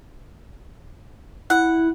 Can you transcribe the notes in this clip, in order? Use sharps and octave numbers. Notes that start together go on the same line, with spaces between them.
E4 F#5